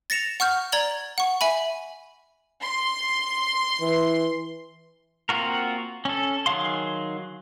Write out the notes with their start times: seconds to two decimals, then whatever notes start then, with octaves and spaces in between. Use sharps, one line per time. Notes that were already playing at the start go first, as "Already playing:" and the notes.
0.10 A6 A#6 C#7 E7 F7
0.40 F#5 C#6 F6 G6
0.72 D5 A#5 G#6 F#7 G7
1.18 F#5 C#6
1.41 E5 G#5 B5
2.62 C6
3.81 E3
5.29 A#3 C4 F4 F#4 A#4
6.05 C#4 A4
6.46 D#3 F#3 G#4 F5 C6